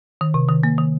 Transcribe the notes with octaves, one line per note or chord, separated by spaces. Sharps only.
D#3
C3
D#3
A#3
D#3